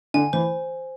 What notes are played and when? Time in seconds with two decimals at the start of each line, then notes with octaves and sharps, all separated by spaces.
0.14 D3 G#5
0.33 E3 C5